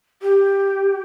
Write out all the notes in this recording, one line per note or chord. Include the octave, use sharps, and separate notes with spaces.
G4